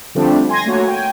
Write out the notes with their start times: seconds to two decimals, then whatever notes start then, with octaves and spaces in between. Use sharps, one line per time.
0.15 D3 F3 G3 A3 C4 D4
0.49 G#5 C6 G#6 A#6
0.66 A3 A#3 F#4 C#5
0.88 G5 G#5